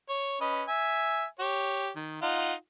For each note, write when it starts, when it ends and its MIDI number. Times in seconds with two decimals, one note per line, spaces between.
0.09 0.40 73
0.41 0.63 61
0.41 0.63 71
0.41 0.63 75
0.68 1.25 76
0.68 1.25 80
1.39 1.89 67
1.39 1.89 73
1.96 2.18 51
2.22 2.53 63
2.22 2.53 65
2.22 2.53 78